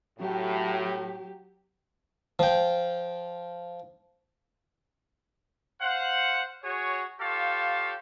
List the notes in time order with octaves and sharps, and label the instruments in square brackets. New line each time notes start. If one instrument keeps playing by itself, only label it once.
[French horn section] A2 [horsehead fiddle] F#3 G4
[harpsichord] F3 G5
[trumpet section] C5 F5 F#5
F#4 G#4 C#5
F4 G4 A4 C#5 F5